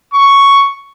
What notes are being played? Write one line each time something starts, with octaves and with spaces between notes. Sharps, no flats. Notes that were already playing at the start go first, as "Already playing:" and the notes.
C#6